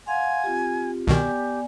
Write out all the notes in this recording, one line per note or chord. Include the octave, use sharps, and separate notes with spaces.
F5 F#5 G#5 C6
C4 F4 G4
C2 B2 D#3 B3 G4 D5 G#5